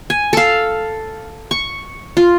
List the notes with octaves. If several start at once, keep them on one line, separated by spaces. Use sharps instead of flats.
G#5
A4 F5
C#6
F4